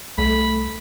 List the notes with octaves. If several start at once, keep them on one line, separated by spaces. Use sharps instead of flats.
C2 A3 B5